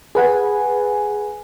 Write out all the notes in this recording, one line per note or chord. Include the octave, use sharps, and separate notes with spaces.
G#4 B4 F#5 G#5